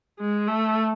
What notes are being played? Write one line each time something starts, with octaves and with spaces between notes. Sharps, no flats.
G#3
A3